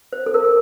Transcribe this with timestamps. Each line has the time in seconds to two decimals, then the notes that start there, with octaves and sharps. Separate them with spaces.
0.13 C5
0.26 A4
0.34 A#4
0.44 A4